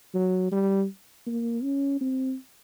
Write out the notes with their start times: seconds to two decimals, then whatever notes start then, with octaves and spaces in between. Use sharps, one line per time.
0.14 F#3
0.52 G3
1.26 A#3
1.63 C#4
2.01 C4